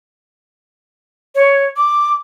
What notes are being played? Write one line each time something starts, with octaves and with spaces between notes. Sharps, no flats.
C#5
D6